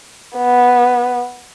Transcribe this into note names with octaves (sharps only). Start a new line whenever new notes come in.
B3